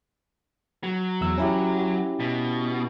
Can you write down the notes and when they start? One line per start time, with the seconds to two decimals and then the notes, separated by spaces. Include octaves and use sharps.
0.84 F#3
1.21 E2 E6
1.38 C#4 E4 G4
2.20 B2